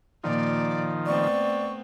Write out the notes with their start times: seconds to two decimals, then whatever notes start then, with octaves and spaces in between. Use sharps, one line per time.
0.24 A#2 D#3 F3 D5
1.06 A3 B3 C4 D5 C#6